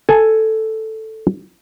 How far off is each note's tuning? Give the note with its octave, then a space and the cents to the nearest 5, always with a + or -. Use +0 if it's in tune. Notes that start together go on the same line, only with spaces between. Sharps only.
A4 +0 G#5 +0